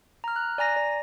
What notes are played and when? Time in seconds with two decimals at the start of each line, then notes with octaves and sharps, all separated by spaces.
0.24 A#5 F6
0.36 F#6
0.58 D5 G#5 A#5 A#6
0.76 D5